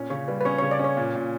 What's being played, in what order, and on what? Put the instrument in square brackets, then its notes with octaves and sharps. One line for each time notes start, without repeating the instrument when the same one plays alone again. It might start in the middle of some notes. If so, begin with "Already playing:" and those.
Already playing: [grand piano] A#2 C#4
[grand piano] C#3 [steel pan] C#5
[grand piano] G3 [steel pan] B4
[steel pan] B4
[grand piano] C#4 [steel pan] C#5
[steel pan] C#5
[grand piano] C#3
[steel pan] D5
[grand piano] C#4 [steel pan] C#5
[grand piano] A#2
A#2